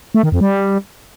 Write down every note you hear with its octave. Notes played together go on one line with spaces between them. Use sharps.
A3
D#3
F2
G3